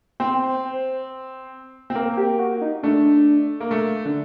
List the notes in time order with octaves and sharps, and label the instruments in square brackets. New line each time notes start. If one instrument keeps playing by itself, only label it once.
[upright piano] C4 [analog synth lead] C5
[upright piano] C4
[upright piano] A#3 [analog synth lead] A#4
[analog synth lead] G4
F#4
D#4
[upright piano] A3 [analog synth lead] D4
[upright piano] A#3
A3
D3